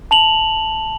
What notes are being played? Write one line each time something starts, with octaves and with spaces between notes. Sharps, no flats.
A5 F7 F#7